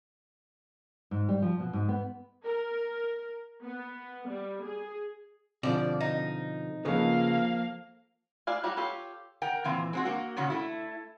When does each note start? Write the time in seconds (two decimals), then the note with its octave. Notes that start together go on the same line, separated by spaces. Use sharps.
1.11 G#2
1.29 G3
1.42 F3
1.60 B2
1.73 G#2
1.89 B3
2.45 A#4
3.63 B3
4.29 G3
4.63 G#4
5.63 B2 D3 F3 C4 D5
6.01 D#4
6.85 C#3 F3 A#3 B3 A4 F5
8.47 A3 D5 F5 G#5
8.63 F#3 G3 F#4 G4 D5
8.77 F4 G4 A4 C#5
9.42 A#4 F#5 G5
9.64 A#2 E3 C4
9.93 G#3 C4 F#4
10.05 A#3 F#4
10.37 A#2 C#3 C#4 F#4
10.50 A3 E4